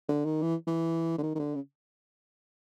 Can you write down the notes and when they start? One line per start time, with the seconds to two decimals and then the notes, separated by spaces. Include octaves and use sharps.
0.09 D3
0.25 D#3
0.42 E3
0.67 E3
1.18 D3
1.23 D#3
1.35 D#3
1.39 D3
1.55 C#3